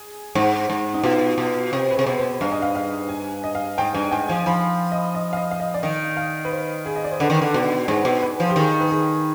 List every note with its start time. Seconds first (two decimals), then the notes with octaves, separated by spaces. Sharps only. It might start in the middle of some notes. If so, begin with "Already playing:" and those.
Already playing: G#4
0.35 G#2
0.70 G#2
0.94 D#4
1.04 B2 F4
1.38 B2
1.72 C3 G4
1.91 B4
1.96 C3 G#4
2.06 B2
2.19 C5
2.41 G2 F5
2.52 D#5
2.62 F5
2.75 F5
3.09 G#5
3.44 D#5
3.55 F5
3.78 G#2 G5
3.95 G2 G#5
4.11 G#2 G5
4.28 F3 G#5
4.46 F3 B5
4.92 D#5
5.15 D#5
5.33 F5
5.37 D#5
5.52 F5
5.60 D#5
5.74 D5
5.83 D#3 D#5
6.17 F5
6.45 B4
6.52 C5
6.86 G#4
6.96 D#5
7.04 D5
7.11 C5
7.20 D3 B4
7.30 D#3
7.42 D3
7.54 B2
7.88 G#2 G#4
8.05 B2
8.22 B4
8.40 F3
8.50 G4
8.56 D#3 G#4
8.80 B4
8.91 G#4